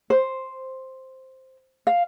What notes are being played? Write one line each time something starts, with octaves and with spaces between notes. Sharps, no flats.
C5
F5